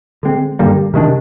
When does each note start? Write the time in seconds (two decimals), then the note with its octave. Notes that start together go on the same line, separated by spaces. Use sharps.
0.23 D3 G#3 C4
0.59 G2 D3 G3 A#3
0.94 C3 D#3 G#3 D4